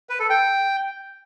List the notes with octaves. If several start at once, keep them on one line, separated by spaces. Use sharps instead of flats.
B4
A4
G5